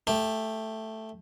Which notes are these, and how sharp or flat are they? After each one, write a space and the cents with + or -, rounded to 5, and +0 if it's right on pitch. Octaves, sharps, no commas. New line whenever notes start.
A3 +0 G4 +15